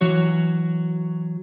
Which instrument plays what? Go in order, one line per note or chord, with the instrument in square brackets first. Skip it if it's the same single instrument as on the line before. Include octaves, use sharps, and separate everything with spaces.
[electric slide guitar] E3 F#3 F#4 C#5